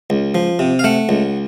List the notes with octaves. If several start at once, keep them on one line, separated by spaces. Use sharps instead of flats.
C#2
F3
C3
F5
A3 F#5
C#2